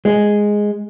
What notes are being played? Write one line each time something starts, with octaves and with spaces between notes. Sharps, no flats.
G#3